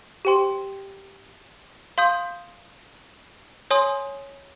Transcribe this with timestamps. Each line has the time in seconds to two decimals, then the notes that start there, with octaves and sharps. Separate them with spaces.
0.25 G4 C5 G5 C6
1.98 F5 C6 D#6 G6
3.71 C#5 G#5 C6 D#6